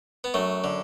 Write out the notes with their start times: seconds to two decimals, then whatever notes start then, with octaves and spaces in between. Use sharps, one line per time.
0.24 B3
0.34 F#2 A3
0.64 D3